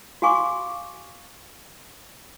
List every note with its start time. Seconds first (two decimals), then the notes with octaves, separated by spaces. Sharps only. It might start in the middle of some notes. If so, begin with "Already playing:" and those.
0.22 F#4 F5 G#5 C#6 D6